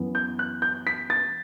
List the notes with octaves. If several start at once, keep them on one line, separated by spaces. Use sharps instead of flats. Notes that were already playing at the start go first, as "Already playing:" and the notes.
Already playing: F#2 E3 B3
G6
F#6
G6
B6
A6